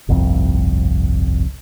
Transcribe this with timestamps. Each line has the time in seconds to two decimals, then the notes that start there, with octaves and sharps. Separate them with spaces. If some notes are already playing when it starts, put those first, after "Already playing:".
0.08 G1 C2 F2 C4